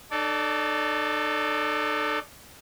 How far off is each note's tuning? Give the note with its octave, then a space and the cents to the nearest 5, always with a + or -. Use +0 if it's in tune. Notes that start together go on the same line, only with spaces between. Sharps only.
D#4 -45 A4 +0 D5 -30